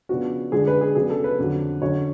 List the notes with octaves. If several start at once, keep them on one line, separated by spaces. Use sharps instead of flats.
C#3 F3 B3 D4 F#4
D3 G#3 D4 G#4
B4
G#4
C#3 F#3 B3 D4 G#4
A4
B4
F2 D3 F#3
D3 F#3 C#4 C#5